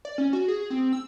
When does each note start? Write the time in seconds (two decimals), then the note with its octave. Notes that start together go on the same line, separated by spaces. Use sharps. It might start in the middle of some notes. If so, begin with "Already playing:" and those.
0.05 D5
0.18 C#4
0.33 F#4
0.48 G#4
0.70 C4
0.93 E6